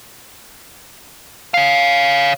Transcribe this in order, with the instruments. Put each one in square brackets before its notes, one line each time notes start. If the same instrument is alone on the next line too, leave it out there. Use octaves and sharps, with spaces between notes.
[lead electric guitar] C#5 F5